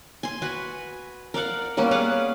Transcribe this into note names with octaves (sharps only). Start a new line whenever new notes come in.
G#5 C6
F#4 B4 G#5
A#4 D5 F5 F#5
G3 A#3 B3 C#4
G#4 B4 F5 F#5